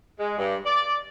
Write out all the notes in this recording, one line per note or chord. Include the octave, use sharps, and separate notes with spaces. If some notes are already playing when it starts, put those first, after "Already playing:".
G#3
G2
D5